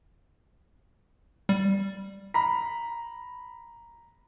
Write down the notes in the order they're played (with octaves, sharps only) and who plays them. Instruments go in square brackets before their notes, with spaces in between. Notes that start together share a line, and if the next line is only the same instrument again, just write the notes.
[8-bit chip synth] G3
[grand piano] A#5 B5